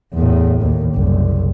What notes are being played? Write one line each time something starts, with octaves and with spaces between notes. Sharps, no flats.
E2 A2
D#2
F#1 C2